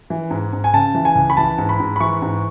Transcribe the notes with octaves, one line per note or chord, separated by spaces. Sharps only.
E3
G#2
G#2
G#5
C#3 A5
E3
G#5
C#2
B5
E3 A5
G#2
B5
G#2
B5
E3 C#6
G#2